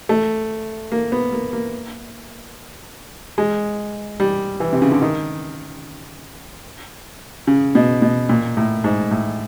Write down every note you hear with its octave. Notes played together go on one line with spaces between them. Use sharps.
A3
A#3
B3
A#3
A#3
G#3
G3
E3
C3
C#3
D3
D#3
C#3
B2
B2
A#2
A2
G#2
A2